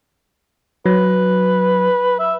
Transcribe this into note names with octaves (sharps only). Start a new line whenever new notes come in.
F#3 B4
E5